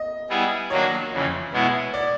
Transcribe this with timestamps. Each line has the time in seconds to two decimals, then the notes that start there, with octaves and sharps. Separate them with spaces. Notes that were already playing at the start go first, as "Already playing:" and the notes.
Already playing: D#5
0.29 G3 B3 E4 G#4
0.70 D#3 F#3 A#3 D4 F#4 C#5
1.12 F2 C#3 E3
1.52 B2 G#3 B3 E4
1.94 D5